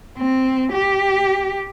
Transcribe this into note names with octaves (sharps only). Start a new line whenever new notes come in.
C4
G4